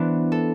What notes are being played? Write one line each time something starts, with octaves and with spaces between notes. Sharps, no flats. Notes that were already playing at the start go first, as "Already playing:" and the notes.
Already playing: E3 B3 D4 C5
A4